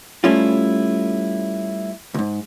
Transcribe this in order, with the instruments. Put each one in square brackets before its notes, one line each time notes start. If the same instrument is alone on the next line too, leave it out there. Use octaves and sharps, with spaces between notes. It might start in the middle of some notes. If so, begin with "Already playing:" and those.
[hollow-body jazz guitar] G3 A3 C#4 E4 F4
C#2 G#2